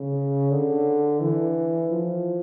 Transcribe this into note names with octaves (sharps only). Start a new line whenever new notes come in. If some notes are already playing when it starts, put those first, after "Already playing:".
Already playing: C#3
D3
E3
F3